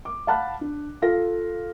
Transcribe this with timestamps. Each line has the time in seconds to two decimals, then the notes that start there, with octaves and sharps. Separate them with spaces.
0.05 D6
0.27 F5 F#5 A5 B5 F#6
0.61 D4
1.02 F4 A4 F5 A#6